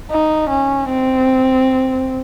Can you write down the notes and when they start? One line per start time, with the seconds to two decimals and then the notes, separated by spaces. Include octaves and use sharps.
0.11 D#4
0.50 C#4
0.89 C4